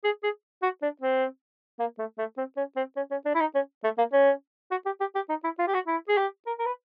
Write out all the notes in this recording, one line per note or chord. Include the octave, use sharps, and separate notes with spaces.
G#4
G#4
F#4
D4
C4
A#3
A3
A3
C4
C#4
C4
C#4
C#4
D4
E4
D#4
C#4
A3
A#3
C#4
F#4
G4
G4
G4
D#4
E4
F4
G4
F#4
E4
G#4
G4
A#4
A#4
B4